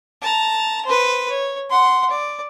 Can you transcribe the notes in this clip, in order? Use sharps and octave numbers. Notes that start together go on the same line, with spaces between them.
A5 A#5
B4 C5
C#5
F#5 C6
D5